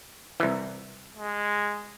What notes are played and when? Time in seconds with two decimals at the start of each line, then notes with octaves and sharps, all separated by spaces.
0.40 C2 E3
1.17 G#3